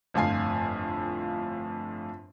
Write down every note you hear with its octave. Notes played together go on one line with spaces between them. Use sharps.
G1 F2 A2 F4 G#5 C7